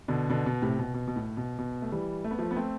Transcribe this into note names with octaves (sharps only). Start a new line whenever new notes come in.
B2 D3
B2 D3
B2
A2 C3
B2
B2
B2
A2
B2
B2
A3
E3 G3
A3
B3
F3 A3
B3
A3 C4